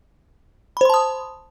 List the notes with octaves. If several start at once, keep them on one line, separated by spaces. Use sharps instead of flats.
C5 A5 B5 C6 D#6